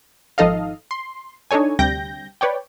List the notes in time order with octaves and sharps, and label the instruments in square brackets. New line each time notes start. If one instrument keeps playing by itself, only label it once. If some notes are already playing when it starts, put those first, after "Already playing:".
[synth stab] G#1 F3 D#4 A4 D#5 F5
C6
D4 D#4 A4 C#5 G#5
D2 C3 G3 G5 G6 A#6
B4 C#5 D5 G5